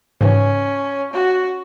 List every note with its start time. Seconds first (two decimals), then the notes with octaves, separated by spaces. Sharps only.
0.21 G#2 C#3 E3 C#4
1.12 F#4